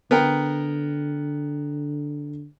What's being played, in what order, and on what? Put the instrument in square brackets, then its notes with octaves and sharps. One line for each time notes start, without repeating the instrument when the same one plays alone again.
[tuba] D3 [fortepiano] B3 A#4 G5